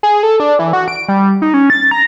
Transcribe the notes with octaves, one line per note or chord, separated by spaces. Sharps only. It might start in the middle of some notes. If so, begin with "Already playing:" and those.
G#4
A4
D4
E3
F#4
D7
G3
D#4
C#4
A6
A#5